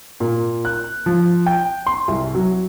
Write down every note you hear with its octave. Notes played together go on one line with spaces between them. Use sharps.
A#2
F#6
F3
G5
C6
C2
F#3